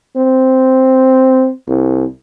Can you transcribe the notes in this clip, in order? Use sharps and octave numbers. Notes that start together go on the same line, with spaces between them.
C4
C2